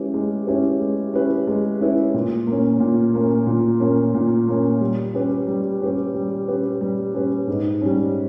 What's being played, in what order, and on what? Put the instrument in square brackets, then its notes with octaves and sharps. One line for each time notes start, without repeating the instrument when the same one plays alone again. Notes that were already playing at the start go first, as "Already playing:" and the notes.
Already playing: [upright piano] G#3 C#4 E4 G4 B4
G#3
C#4 E4 G4 B4
G#3
C#4 E4 G4 B4
G#3
C#4 E4 G4 B4
A#2
A#3 C#4
A#2
A#3 C#4
A#2
A#3 C#4
A#2
A#3 C#4
G3
C#4 G4 B4
G3
C#4 G4 B4
G3
C#4 G4 B4
G3
C#4 G4 B4
G#2
G3 C#4